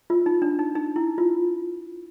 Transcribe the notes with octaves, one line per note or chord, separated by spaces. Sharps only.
F4
D#4
D4
D#4
D#4
E4
F4